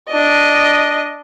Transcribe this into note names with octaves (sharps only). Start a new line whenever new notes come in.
D4 D#5